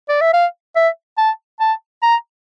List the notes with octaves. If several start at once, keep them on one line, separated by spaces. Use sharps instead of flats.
D5
E5
F5
E5
A5
A5
A#5